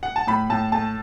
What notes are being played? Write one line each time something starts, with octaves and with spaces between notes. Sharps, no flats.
F#5
A5
A2 B5
A2 A5
A3 A5